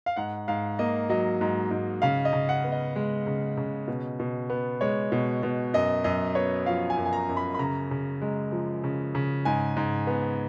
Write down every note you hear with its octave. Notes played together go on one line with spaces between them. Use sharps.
F5
G#2 F#5
G#2 F5
A#3 D#5
F#3 D#5
G#2
G#2
C#3 F5
D#5
C#3
F#5
B3
D#5
G#3
C#3
C#3
B2
B2
B3
G#3 C#5
B2
B2
F#2 D#5
F#2 D#5
B3 C#5
F3 F5
G#5
F#2
G#5
A#5
F#2
B5
B5
C#3 A#5
C#3
G#3
F3
C#3
C#3
G#2 G#5
G#2
B3